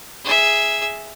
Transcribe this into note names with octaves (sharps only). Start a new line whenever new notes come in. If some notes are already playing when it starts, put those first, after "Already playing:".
G#4 E5